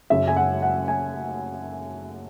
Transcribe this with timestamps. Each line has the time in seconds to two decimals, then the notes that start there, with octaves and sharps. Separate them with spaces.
0.10 F#1 F#2 C#3 E5
0.28 G#5
0.36 F#5
0.62 F#5
0.88 G#5